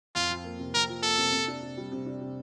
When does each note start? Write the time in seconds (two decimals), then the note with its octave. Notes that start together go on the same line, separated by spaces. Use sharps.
0.15 F2 F4
0.30 F3
0.44 A#3
0.59 C3
0.74 F2 A#4
0.89 F3
1.03 A#3 A4
1.18 C3
1.33 C3
1.48 D4
1.63 C3
1.77 G3
1.92 C3
2.06 D4
2.21 C3